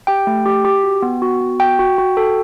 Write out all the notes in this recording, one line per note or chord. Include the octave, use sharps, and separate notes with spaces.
G4 G5
A3
G4
G4
F#4
B3
F#4
B3
F#4 G5
F#4
F#4
A4